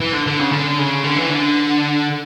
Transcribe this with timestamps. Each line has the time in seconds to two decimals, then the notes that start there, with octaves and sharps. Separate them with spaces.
0.01 E3
0.13 D3
0.27 D3
0.40 C#3
0.52 D3
0.78 C#3
1.04 D3
1.16 E3
1.29 D3